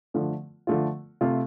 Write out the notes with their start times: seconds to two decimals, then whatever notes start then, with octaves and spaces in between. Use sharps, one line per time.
0.14 D3 F3 A3 F4
0.67 D3 F3 A3 F4
1.21 C3 A3 F4